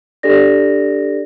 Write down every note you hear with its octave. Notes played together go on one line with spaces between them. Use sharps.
D4 G4 A4 D5 A#6